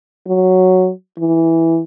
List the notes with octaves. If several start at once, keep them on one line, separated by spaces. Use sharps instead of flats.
F#3
E3